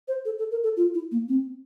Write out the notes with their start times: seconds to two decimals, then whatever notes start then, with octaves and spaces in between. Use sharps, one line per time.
0.08 C5
0.25 A4
0.38 A4
0.51 A#4
0.64 A4
0.77 F4
0.94 E4
1.12 A#3
1.29 C4